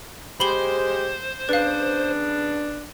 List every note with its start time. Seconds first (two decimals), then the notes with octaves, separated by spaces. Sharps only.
0.40 G#3 G4 C5 B5 F#7 G7
1.49 C#3 B3 D4 B4 F5